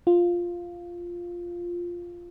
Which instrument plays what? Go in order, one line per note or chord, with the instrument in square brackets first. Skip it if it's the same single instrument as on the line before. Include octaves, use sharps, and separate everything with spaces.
[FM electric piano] F4